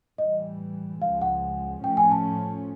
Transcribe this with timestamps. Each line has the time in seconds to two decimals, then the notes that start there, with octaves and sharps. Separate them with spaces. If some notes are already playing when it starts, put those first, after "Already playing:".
0.18 A2 E3 G3 D#5
1.01 C#2 C#3 F3 G#3 F5
1.22 F#5
1.84 A2 F3 A3 C#4 G5
1.97 G#5
2.11 A5